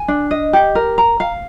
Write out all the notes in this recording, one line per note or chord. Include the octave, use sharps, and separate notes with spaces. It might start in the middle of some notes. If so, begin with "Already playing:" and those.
Already playing: G#5
D4
D#5
G4
A#4
A#5
F5